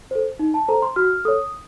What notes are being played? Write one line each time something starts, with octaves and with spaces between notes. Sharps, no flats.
A4 C5
D#4
A5
A4 C5 A#5
C6
F#4 F6
A4 C#5 D#6